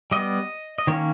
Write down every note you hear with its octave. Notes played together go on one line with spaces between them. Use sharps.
G3 B3 D#5
D#5
D#3 A#3 C#4 C#5